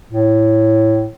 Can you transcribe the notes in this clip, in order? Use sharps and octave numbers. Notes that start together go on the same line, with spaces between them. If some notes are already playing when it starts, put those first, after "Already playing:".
A2